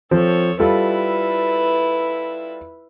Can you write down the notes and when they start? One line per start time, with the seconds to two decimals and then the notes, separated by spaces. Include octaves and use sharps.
0.11 F3 C4 A4 C#5
0.60 G3 E4 F4 A4 B4